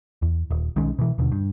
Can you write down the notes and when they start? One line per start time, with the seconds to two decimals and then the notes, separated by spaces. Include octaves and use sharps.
0.22 E2
0.51 D#1
0.76 B1 D#3 G#3 C#4
0.99 B2 E3
1.18 D#2 B2 D3
1.32 G2